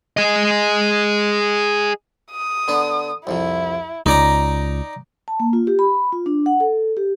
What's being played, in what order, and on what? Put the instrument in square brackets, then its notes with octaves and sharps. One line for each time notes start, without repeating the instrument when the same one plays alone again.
[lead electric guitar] G#4 D#5
[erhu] D#6
[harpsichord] D3 B3 D4
[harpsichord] C2 F2 C3 [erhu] E4
[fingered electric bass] C#2 [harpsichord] D#4 D5 A#5
[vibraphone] A5
A#3
F4
G4
B5
F4
D4
F#5
A4
G4